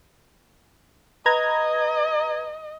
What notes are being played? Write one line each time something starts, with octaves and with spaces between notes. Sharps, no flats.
B4 D#5 A#5 G#6